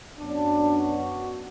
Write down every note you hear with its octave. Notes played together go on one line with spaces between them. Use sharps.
F#2 F#3 B3 D4
F#4